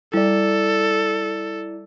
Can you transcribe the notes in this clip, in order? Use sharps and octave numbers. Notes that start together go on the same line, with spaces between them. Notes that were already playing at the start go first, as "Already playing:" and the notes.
G3 E4 A4 D5